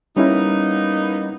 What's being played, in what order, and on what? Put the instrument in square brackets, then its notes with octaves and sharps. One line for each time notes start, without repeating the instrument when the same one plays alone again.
[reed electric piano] G3 C#4 E4 [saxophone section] A#3 B3 D#4